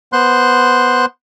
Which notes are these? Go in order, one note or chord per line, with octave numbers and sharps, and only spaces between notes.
B3 C5 C6 F#6